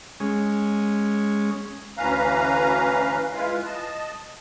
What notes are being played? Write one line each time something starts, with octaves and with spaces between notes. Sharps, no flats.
G#3 C#4
D2 E3 C#4 B4 F5 A#5
G#3 E4 F4 B4 F5
D#5 A5